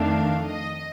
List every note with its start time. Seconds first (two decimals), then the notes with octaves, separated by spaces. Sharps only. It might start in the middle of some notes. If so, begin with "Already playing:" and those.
Already playing: F2 D#3 A3 D4 F5
0.49 D#5